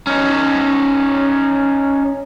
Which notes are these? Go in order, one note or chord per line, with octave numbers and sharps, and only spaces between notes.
C#4 D#4